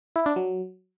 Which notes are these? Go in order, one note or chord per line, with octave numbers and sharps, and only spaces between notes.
E4
D4
F#3